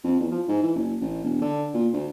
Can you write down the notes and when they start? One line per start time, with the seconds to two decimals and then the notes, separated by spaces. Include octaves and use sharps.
0.04 F2
0.20 E2
0.31 F3
0.48 G#2
0.63 E3
0.76 F#1
1.01 A1
1.24 E1
1.42 D3
1.74 A#2
1.93 D2